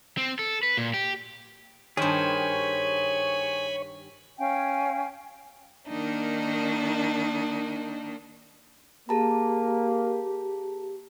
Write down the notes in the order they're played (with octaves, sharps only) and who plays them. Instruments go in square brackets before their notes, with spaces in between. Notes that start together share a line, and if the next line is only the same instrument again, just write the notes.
[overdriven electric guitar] C4
A4
B4
A#2
G4
[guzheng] G2 D#3 [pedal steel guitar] G#4 C5 [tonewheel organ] C#5 [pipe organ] G#5 B5
[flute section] C#4 F5 G5 G#5
[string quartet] D#3 A#3 D4 D#4
[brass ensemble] A#3 [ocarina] G4 [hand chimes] G#4 A5 A#5